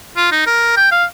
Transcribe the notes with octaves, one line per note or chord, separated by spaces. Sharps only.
F4
D#4
A#4
G5
F5